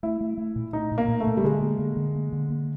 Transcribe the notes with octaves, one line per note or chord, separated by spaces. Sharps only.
A3 E4
A3
A3
A#2
A3 D#4
A#2
A#3
A#2
A3
A#2
G3
D3 G#3
A#3
D3
D3
A#3
D3
A#3